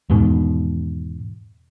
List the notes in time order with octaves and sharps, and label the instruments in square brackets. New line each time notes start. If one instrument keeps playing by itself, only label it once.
[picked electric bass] E2 G#2 B2 D#3